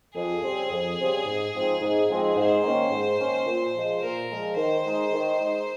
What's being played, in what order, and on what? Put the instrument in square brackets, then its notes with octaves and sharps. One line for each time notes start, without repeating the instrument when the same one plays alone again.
[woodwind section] F2 [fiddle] G#4
[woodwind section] C#3 G3 C4
F2
C#3 G3 C4
G#2
F3 G#3 C4 D#4
G#2
F3 G#3 C4 D#4
[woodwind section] G#2 [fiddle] C5
[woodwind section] D#3 A#3 C#4
G#2
D#3 A#3 C#4
A#2
F3 G#3
[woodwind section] A#2 [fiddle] A#4
[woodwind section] F3 G#3
[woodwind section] D#3 [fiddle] C5
[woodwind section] G#3 D#4
D#3
G#3 D#4